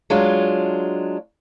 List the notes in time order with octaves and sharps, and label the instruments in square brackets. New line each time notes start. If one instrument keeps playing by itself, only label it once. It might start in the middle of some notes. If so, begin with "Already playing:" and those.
[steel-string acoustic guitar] F#3 G#3 D4 F4